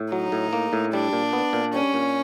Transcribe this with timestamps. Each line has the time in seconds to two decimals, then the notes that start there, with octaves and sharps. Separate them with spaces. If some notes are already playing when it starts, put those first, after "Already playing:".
Already playing: A2
0.12 F#3 D#4
0.32 A2
0.53 A#3
0.73 A2
0.93 G3 D4
1.13 A#2
1.33 B3
1.53 A#2
1.73 G3 C#4
1.94 A#2